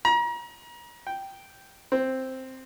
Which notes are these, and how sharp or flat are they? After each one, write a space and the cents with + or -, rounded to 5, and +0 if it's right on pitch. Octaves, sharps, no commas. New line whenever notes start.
A#5 +35
G5 -5
C4 +0